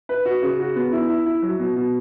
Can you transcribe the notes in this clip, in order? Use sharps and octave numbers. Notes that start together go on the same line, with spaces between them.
B4
F#4
C#3
F#4
B3
E4
E4
E4
F#3
B2
B2